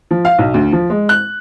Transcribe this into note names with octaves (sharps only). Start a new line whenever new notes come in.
F3
F5
B1
D2
F3
G#3
F#6